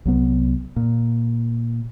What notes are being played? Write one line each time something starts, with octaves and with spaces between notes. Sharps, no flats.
C2 F#3 B3
A#2